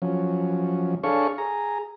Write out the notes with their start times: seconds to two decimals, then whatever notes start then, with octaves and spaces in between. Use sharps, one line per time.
0.02 F3 F#3 C#4
1.04 D4 G#4 A4 C#5 F5 C#6
1.38 G#4 A#5